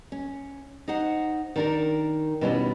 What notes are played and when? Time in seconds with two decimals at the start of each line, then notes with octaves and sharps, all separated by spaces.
0.12 C#4
0.88 D#4 C5 F#5
1.56 D#3 D4 A#4
2.41 B2 D#3 G3 C#4 D4 E4